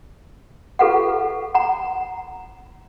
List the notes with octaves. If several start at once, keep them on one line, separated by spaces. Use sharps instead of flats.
F4 G4 A4 B4 F5 F#5
F#5 A#5